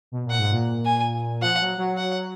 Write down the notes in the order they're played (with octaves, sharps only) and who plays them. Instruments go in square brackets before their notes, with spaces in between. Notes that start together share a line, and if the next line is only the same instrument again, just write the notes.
[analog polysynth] B2
A#2
[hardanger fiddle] F#5
[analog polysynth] G#2
A#2
[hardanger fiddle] G#5
[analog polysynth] F3 [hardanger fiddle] F#5
[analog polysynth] F#3
F#3
[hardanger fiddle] F#5